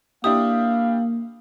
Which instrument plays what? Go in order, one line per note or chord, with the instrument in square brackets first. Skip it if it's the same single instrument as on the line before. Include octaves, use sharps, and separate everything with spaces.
[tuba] A#3 [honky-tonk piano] D4 E4 G4 [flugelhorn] F5 [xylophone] D#6